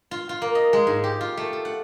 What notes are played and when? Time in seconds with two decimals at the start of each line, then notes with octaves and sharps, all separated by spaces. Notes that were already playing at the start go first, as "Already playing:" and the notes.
0.11 F4
0.29 F4
0.42 A#3
0.55 D#5
0.73 G#3
0.87 G#2
1.04 G4
1.21 F4
1.37 A3
1.53 A4
1.65 F#5